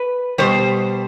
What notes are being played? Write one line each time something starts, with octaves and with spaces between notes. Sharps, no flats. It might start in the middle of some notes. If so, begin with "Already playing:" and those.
Already playing: B4
B2 G3 C5